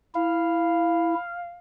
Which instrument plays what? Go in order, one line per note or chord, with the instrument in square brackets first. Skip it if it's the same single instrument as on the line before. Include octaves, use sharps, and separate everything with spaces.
[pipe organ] E4 [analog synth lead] F5